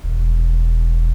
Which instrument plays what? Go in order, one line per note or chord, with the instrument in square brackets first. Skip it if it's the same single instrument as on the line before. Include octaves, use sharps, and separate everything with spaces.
[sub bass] E1